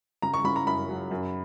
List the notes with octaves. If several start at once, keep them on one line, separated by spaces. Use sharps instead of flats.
C#3 A#5
C#6
C#3 B5
A#5
F#2 B5
F#3
F#2